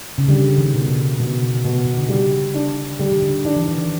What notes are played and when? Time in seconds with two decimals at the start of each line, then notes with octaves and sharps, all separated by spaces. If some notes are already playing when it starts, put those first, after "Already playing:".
0.18 C#3
0.28 D3 G3
0.58 D#3
0.74 B2
0.88 C#3
1.19 B2
1.64 B2
1.85 D#3
1.97 D3
2.09 C#3 G3
2.54 D4
2.99 D3 G3
3.11 D#3
3.22 D3
3.45 D#3 D4
3.56 E3
3.68 D#3